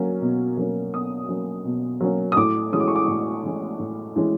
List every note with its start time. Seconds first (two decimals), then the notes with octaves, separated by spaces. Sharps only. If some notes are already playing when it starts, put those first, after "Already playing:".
Already playing: F#3 A#3 C#4
0.21 B2
0.57 F#3 A#3 C#4
0.93 B2 D#6
1.29 F#3 A#3 C#4
1.65 B2
2.01 F#3 A#3 C#4
2.32 D#6
2.37 A2 D6
2.72 E3 G#3 C#4 D#6
2.80 D6
2.88 C#6
2.96 D6
3.08 A2
3.43 E3 G#3 C#4
3.79 A2
4.16 E3 G#3 C#4